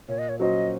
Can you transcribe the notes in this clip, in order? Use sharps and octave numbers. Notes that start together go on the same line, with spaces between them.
A#2 C#5
D#5
C#5
F#3 C#4 F#4 C5 D#5